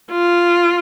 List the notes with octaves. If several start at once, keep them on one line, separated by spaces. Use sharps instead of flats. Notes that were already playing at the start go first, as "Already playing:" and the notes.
F4